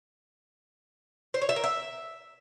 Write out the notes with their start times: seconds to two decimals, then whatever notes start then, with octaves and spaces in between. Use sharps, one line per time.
1.34 C5
1.42 C#5
1.49 E5
1.56 A#4
1.64 E5